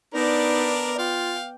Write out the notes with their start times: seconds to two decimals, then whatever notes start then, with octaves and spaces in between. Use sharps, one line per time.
0.14 B3 D4 D#4 A#4 D5
0.99 F4 F5 G5